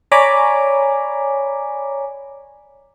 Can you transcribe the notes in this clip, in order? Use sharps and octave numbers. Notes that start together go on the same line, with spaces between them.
C#5 D5 G#5 A#5 B5 D6